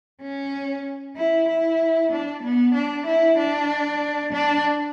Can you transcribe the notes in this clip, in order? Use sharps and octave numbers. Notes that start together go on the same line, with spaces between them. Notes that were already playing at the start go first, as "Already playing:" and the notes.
C#4
E4
E4
D4
B3
D4
E4
D4
D4